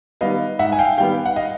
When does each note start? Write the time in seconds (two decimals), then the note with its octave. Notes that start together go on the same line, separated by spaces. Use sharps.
0.21 D#3 G3 B3 D#5 F5
0.59 G#2 E5 F#5
0.72 G#5
0.79 F5 G5
0.98 D#3 G3 B3 F5 G5
1.26 F#5
1.36 D#5 F5